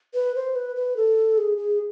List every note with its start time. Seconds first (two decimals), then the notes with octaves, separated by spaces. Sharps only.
0.14 B4
0.35 C5
0.56 B4
0.76 B4
0.97 A4
1.38 G#4
1.57 G#4